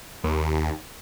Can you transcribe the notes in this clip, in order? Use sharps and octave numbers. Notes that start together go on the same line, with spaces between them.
D#2